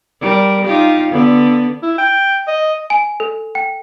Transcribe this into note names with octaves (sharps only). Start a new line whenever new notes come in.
G3 A#4
D#4 F4 G4
D3 B3
E4
G5
D#5
G#5
A4
G5